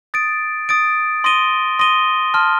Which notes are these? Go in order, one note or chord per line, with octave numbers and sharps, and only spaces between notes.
D#6 A6 D7
D#6 A6 D7
C6 D#6 A#6 D#7 G7
C6 D#6 A#6 D#7 G7
A5 C6 F6